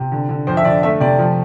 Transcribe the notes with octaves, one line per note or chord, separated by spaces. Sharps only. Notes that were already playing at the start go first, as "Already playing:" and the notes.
Already playing: C3
D3
D3
F2 C5
E5
D3 D5
A3 E5
C3 D5
F3